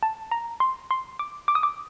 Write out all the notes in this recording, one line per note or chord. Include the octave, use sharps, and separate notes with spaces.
A5
A#5
C6
C6
D6
D6
D#6
D6